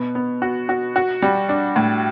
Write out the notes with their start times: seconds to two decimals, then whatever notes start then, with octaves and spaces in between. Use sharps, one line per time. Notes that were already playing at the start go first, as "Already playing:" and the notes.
Already playing: B2 B3
0.15 B3
0.42 F#4
0.69 F#4
0.96 F#4
1.22 G3
1.49 D4
1.76 A2